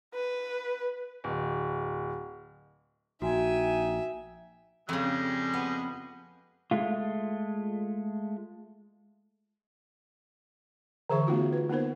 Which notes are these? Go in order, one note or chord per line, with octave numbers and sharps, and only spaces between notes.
B4
D1
A#1 D#4 F#4 E5 G5 G#5
F2 C#3 G3 G#3
B3
G#3 A3 F4
D3 E3 G#4 C5 E5 C#6
A3 B3 D#4 F4 F#4
B4
A#3 B3 D#4 A#4 C5